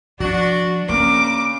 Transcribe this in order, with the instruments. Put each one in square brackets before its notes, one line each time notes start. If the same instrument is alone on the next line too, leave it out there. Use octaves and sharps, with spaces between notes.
[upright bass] F3 [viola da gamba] D4 [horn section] F#4
[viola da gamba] C#3 [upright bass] A#3 [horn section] C4 G#4 A#4 [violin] D6